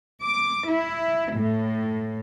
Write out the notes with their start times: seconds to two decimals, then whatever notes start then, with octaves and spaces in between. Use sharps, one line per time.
0.23 D6
0.69 E4
1.34 A2